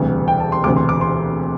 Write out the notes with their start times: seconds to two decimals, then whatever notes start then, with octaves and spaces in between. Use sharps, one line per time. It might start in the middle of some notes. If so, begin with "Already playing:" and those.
Already playing: E1 D2 C3 G3
0.28 G5
0.40 A5
0.52 C6
0.64 E1 D2 C3 D6
0.76 C6
0.89 D6
1.01 C6